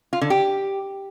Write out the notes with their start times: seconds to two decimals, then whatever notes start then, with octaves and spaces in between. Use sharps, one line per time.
0.13 F4
0.21 D3
0.30 G4